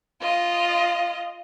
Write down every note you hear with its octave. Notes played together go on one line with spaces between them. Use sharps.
F4 D#5